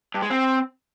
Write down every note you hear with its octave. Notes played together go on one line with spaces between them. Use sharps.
G2
G#3
C4